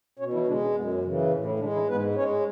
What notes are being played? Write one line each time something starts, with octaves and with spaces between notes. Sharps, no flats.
B2 C#4 C#5
E3 E4
D3 G#3 D4
C#4
F#2 B3
C#4
C#3 E3
A2 C#4
E3 E4
D3 G#3 D4
E3 E4
G#2 B3 B4
G#3 C#4 C#5